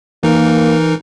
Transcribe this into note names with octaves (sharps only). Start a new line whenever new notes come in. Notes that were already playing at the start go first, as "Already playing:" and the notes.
E3 A#3 D#4 A#4